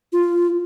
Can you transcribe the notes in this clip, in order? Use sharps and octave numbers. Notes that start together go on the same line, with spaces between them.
F4